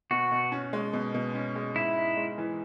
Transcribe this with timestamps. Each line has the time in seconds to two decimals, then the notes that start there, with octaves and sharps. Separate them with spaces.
0.11 B2 F#4
0.31 B2
0.52 C#4
0.73 G#3
0.93 B2
1.14 B2
1.35 C#4
1.55 G#3
1.76 G#2 E4
1.96 D#4
2.17 G#3
2.38 E3